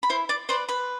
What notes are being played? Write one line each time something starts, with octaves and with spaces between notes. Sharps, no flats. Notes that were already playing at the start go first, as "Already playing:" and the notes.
B5
E4 C5 C6
D5 D6
B4 C5 D5 C6
B4 B5